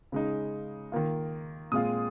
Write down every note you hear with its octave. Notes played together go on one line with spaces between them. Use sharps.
C#3 G#3 D#4
D#3 A#3 F4
A#2 G#3 C4 F4 D#6